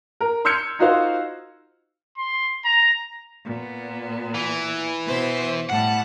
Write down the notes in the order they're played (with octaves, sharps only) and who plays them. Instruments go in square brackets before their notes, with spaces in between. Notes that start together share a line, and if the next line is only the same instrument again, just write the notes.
[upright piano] A#4
C6 E6 F6 G6 G#6 C#7
D#4 F4 F#4 A#4 C5 F5
[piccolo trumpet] C6
A#5
[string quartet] A#2 B3
[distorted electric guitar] E3
[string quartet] B2 C5 E5
[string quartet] A2 G3 A5 [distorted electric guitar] F#5